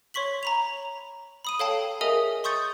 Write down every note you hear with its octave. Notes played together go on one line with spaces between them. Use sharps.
C#5 C6 C#6 B6 F#7
A#5 B5 F7
B5 D#6 D#7
A4 C#5 F5 G5 A5 C7
G#4 A#4 D#5 E5 G#5 D#6
C6 C#6 D#6 G6 A6 C#7